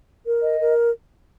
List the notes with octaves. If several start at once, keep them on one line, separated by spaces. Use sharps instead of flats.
A#4
D#5
A#4